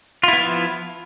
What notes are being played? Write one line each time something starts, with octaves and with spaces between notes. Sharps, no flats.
F3 B3 E4 F4